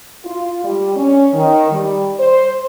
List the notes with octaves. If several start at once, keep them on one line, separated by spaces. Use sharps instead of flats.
F4
G3
C#4
D#3
G3
C5